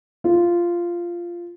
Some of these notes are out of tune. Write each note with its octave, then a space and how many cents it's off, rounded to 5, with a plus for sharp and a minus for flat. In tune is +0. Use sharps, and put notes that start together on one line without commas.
F4 -10